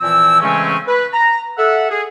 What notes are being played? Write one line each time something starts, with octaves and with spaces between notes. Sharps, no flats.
A#2 E3 F3 C4 E4 E6
C#3 E3 G#3 A3 C4 C#4
B4
A#5
A4 E5 F#5
G#4